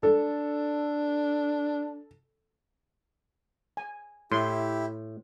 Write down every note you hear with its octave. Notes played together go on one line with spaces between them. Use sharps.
D4 A4
G#5
A2 E4 G4 C6